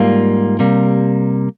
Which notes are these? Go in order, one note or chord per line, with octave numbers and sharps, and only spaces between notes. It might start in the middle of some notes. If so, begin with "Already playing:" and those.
Already playing: G#2 G3 A#3 F4
C3 G3 A#3